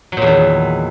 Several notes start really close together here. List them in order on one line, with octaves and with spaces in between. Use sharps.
F#3 A#2 E2 D#3